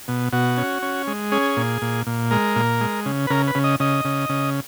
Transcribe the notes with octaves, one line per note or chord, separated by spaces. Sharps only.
B2
B2 F#4
C#4
C#4
G#3
C#4 G#4
A#2
A#2
A#2
G#3 A#4
A#2
G#3
C#3
B4
C#3 A#4
B4
C#3
D#5
C#3 D#5
C#3
C#3